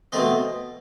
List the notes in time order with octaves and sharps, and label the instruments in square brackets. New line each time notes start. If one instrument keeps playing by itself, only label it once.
[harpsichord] B2 A3 C4 D#5